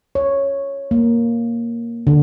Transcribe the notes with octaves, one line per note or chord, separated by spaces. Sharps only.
C#5
A#3
D3